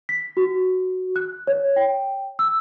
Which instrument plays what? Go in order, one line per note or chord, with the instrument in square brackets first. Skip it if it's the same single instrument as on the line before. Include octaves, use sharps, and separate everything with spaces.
[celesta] B6
F#4
F#6
C#5
G5
E6